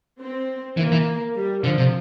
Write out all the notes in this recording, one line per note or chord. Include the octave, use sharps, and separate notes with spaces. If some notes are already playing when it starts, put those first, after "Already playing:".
C4
E3 A#3
E3
G3
D3 F3
C3